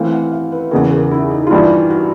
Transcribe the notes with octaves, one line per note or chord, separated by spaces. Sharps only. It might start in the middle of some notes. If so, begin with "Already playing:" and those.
Already playing: E3 A3 C4 F5
F#5
F5
B4
E2 C#3 E3 A#4
A#4
E4
D#4
F4
G2 E3 G3 E4
F#4